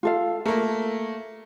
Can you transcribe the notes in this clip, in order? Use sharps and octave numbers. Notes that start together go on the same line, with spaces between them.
F4 A4 F5
A3 A#3 A#4